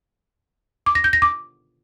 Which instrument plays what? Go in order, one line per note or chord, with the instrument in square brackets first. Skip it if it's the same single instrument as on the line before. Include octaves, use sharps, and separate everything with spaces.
[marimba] D6
A#6
G6
A#6
D6